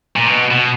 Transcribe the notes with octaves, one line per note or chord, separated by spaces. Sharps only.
A#2
B2
B2